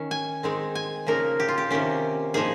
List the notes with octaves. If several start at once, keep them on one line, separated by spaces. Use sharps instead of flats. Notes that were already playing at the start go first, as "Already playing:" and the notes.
Already playing: D#3 C#4
G#5
D#3 G#3 C4 D#4
G#5
C#3 F3 A#3 D#4 A#4
G4
F4
G4
C3 D#3 A#3 C#4 G4
A#2 F3 A#3 D#4 G#4